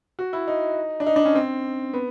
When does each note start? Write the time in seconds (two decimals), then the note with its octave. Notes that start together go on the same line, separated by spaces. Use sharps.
0.19 F#4
0.33 E4
0.48 D#4
1.00 D4
1.06 D#4
1.16 D4
1.25 C#4
1.35 C4
1.93 B3